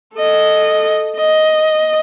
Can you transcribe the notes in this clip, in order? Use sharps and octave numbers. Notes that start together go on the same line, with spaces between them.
A4 D#5
D#5